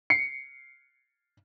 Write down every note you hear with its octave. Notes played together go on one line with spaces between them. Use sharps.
C7 C#7